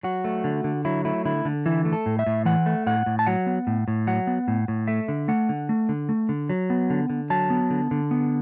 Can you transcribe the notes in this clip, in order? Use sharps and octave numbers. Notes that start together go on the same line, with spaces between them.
F#3 F#4
A3
D3
D3
F#3 E4
A3 E4
D3 E4
D3
E3 E4
A3
A4
A2
E5
A2
E3 F#5
A3
A2 F#5
A2
A5
F#3 F#5
B3
A2
A2
F#3 F#5
B3
A2
A2
A3 E5
D3
A3 F#5
D3
A3
D3
A3
D3
F#3
B3
D3
D3
F#3 A5
B3
D3
D3
B3